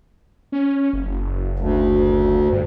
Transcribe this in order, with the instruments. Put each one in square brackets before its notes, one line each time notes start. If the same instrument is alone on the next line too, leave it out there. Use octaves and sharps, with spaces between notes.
[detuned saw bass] C#4
F#1
[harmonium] D2
[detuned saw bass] G2